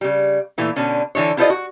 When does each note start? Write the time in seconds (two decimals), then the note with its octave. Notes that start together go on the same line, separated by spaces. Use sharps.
0.01 C#3 G3
0.58 A#2 E3 A3
0.76 B2 D3 C#4 D4
1.15 D3 E3 D4 C#5
1.37 E4 F4 A4 C5 D5 D#5
1.50 F#4